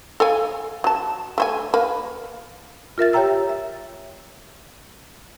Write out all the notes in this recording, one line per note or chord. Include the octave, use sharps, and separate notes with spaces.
A4 F5 G#5
F#3 A5
A3 C5 G#5
A#3 B4
F4 A#4 E5 A6
G4 C#5 E5 G5 A#5 E6
E5